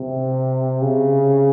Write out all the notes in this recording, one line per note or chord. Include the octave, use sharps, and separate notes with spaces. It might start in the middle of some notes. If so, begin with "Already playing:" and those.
Already playing: C3
C#3